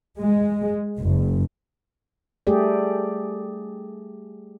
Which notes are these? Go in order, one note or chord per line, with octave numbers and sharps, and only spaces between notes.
G#3
F#1
G3 A3 G4 G#4 D5